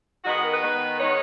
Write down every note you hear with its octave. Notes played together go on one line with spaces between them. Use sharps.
D#3 G#3 B3 F#4
G#4
A#4
B4
D#3 G#3 B3
D#3 G#3 B3 C#5